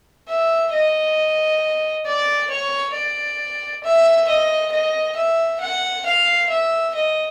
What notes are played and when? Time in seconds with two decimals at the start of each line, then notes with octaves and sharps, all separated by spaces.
0.28 E5
0.73 D#5
2.06 D5
2.50 C#5
2.94 D5
3.83 E5
4.28 D#5
4.72 D#5
5.16 E5
5.61 F#5
6.06 F5
6.50 E5
6.95 D#5